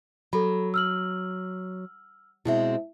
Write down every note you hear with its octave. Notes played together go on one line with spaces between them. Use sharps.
F#3 A4 B5
E6 F6 F#7
B2 G#3 C4 E4 E5